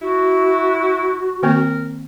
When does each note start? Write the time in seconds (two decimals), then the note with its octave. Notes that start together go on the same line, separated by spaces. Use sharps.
0.02 E4 F#4
1.43 D#3 A#3 C4 A#4